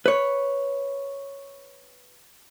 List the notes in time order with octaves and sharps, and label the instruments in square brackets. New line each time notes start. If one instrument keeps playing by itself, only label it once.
[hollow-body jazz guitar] B4 C#5